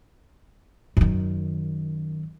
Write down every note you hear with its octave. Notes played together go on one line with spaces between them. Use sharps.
F#2 D#3